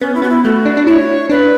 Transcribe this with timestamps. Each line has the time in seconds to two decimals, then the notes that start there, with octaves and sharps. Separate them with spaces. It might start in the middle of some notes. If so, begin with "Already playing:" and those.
0.01 B3 C#4
0.15 E4
0.22 B3 F#4
0.30 E4
0.44 A3 F#4
0.65 D4
0.77 D4
0.87 E4 C#5
1.30 D4 B4